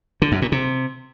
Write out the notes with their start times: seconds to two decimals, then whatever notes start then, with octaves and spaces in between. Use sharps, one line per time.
0.22 D3
0.32 F#2
0.42 A#2
0.52 C3